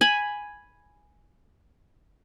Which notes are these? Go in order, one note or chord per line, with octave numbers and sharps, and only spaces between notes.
G#5 B5